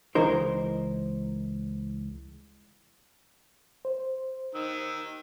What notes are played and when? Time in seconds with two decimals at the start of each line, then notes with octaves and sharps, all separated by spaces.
0.15 C#2 E3 D#4 A#4 C5
3.85 C5
4.55 D#3 E6